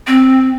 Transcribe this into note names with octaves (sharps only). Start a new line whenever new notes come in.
C4